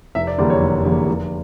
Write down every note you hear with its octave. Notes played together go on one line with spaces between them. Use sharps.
F1 E5
D5
E2 D3 G3 A#3 D5
C#5
F1
E2 D3 G3 A#3
F1